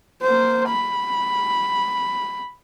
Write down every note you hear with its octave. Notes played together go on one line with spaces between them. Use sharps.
A#3 C5
B5